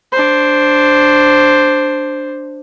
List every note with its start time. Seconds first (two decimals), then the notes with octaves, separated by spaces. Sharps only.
0.12 D4 C5